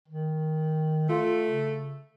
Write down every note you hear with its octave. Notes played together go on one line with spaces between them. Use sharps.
D#3
A3 F4
C#3